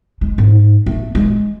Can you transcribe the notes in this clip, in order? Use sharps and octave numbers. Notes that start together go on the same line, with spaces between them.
G#3
G#2
A3
G#3